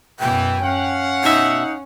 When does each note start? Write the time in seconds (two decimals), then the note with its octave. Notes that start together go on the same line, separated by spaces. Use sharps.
0.20 F#2 B2 E3 G5
0.63 C#4 F5 F#5
1.24 B2 D#4 E5